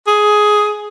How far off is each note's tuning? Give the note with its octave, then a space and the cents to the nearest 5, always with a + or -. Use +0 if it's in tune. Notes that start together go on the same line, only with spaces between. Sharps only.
G#4 +10